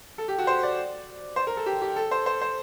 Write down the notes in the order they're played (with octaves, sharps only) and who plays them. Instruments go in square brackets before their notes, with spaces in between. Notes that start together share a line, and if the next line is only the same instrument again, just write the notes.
[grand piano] A4
G4
F#4
C5
D5
C5
A#4
A4
G4
G4
A4
C5
C5
C5